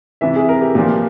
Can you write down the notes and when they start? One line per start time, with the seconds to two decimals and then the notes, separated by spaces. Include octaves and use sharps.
0.21 C3 E3 E5
0.36 G#4
0.49 A#4
0.61 G4
0.75 A#2 F3 G4